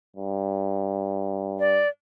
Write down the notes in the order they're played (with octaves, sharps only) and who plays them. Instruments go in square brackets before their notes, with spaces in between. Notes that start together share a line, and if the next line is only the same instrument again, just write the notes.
[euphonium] G2
[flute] D5